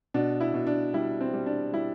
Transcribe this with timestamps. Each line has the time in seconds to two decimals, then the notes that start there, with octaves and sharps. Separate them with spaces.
0.14 B2 D4
0.40 E4
0.54 B2
0.67 D4
0.94 G3 E4
1.21 C4
1.33 G3
1.46 D4
1.73 G3 E4